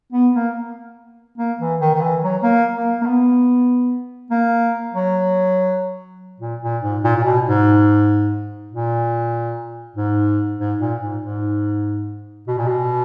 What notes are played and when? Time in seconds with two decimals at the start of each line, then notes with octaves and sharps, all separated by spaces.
0.12 B3
0.34 A#3
1.38 A#3
1.60 E3
1.80 D#3
1.94 D#3
2.01 E3
2.22 F#3
2.43 A#3
2.74 A#3
3.02 A#3
3.06 B3
4.31 A#3
4.94 F#3
6.40 A#2
6.62 A#2
6.82 G#2
7.04 A#2
7.16 A#2
7.24 B2
7.45 G#2
8.71 A#2
9.96 G#2
10.59 G#2
10.80 A#2
11.01 G#2
11.22 G#2
12.48 B2
12.58 A#2
12.67 B2